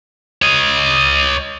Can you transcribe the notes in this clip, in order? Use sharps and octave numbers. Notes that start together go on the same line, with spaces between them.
C#5 D#5